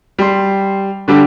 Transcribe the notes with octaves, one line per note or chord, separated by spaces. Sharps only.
G3 C6
D3 G3 D4 G4